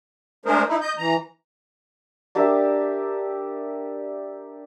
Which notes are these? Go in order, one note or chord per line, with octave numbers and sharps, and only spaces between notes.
G#3 A3 D4 G#4 A#4 C5
D#4 E4
D#5 G6
E3 A#5
D4 G4 A#4 E5